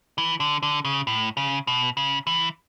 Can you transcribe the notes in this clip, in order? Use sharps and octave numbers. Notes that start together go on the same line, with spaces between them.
E3
D3
D3
C#3
A2
C#3
B2
C#3
E3